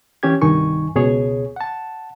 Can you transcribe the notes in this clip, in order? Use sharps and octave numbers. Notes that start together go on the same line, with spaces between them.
E3 C#4 G4 G#6
C2 G2 D#3 D#4 G#5 C#6
C#2 B2 G#4 C#5
F#5 A5